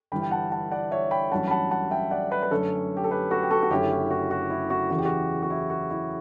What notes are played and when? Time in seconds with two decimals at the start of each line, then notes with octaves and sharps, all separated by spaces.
0.12 G1 G2 E3 G5 B5
0.22 G5
0.31 F#5 A5
0.52 F#5 A5
0.71 D5 F#5
0.91 C#5 E5
1.11 G5 B5
1.31 A1 G2 F#3 C#4 F#5 A5
1.47 B5
1.51 F#5 A5
1.71 F#5 A5
1.91 E5 G5
2.11 D5 F#5
2.31 B4 D5
2.43 B4
2.50 F#2 D3 A3 C#4 A4 C#5
2.97 G4
3.04 A4
3.11 G4 B4
3.30 F#4 A4
3.43 G4
3.51 F#4 A4
3.63 F#4
3.70 F#1 F#2 D3 A3 C#4 E4 G4
3.91 F#4
4.10 F#4
4.31 F#4
4.50 E4
4.70 F#4
4.90 E2 C#3 E3 F#4
4.98 G4
5.05 F#4
5.43 F#4
5.50 E4
5.70 F#4
5.91 E4